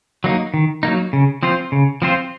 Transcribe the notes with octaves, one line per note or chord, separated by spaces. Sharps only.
F#3 A#3 D#4
D#3
F#3 A#3 D#4
C#3
F3 C4 F4 C5
C#3
F3 C4 F4 C5